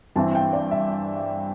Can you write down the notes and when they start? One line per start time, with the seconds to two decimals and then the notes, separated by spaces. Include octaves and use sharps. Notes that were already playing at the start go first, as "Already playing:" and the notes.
0.16 G2 E3 C4 E4 A5
0.35 G5
0.53 D5
0.71 E5